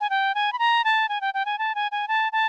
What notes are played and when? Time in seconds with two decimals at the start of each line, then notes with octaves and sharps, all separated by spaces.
0.01 G#5
0.10 G5
0.35 G#5
0.53 B5
0.59 A#5
0.85 A5
1.09 G#5
1.21 G5
1.34 G5
1.45 G#5
1.59 A5
1.75 G#5
1.92 G#5
2.08 A5
2.32 A5